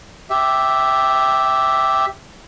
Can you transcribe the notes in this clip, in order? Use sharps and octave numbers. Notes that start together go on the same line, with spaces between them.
G4 E5